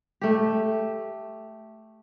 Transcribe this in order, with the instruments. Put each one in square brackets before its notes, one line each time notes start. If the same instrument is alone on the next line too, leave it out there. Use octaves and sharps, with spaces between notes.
[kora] A3 G4